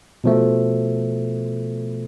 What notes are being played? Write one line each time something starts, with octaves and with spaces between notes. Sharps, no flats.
B2 F3 A3